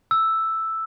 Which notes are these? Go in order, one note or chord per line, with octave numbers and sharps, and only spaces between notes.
E6